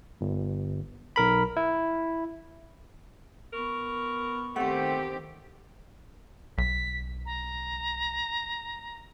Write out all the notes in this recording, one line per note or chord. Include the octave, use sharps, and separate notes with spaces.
G1
B1 A#4 B5
E4
B3 A#4 C#6
D#3 A3 C4 G4 F#5 C6
B1 B6
A#5